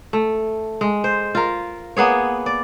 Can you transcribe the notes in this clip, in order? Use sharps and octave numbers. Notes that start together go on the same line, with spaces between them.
A3
G#3
C5
F4 A#4
A#3 B3 G#4 C#5
D5